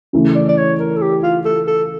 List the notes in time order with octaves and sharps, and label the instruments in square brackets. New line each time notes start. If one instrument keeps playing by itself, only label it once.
[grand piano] C#3 E3 A3 E4
[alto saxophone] D5
D5
C#5
A#4
A4
G4
F4
A4
A4